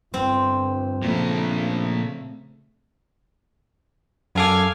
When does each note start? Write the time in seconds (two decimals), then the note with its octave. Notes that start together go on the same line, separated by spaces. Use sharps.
0.14 G1 C4
1.02 A#2 C#3 F3 A3
4.35 F#2 A4 F5 G#5 D6